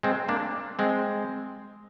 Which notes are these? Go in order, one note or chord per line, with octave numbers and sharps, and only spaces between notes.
G#3 C4
A#3 D4
G#3 C4